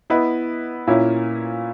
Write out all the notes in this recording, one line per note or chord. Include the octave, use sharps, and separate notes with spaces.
B3 E4 B4 D#5
A#2 A#3 C#4 E4